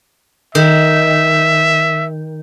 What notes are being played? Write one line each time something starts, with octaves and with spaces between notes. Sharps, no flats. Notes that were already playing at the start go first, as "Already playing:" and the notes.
D#3 E5